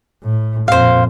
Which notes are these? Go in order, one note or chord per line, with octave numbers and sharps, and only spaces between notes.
A2
F2 A#2 C5 F5